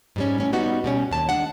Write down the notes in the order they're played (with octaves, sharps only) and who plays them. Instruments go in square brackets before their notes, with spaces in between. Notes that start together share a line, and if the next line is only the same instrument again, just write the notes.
[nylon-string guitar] G#2 G3 C#4
A2 C#4
G3 B3 D#4 F#4
B2 G3 C#4
D#2 A5
G#3 D4 F#5